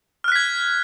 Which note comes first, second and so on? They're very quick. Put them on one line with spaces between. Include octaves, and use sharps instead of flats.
F6 F#6 B6 G#6